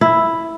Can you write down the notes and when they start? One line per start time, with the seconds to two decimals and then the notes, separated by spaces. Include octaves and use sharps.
0.01 E4